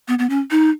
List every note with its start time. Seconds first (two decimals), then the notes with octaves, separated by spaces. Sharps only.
0.08 B3
0.19 B3
0.30 C#4
0.51 D#4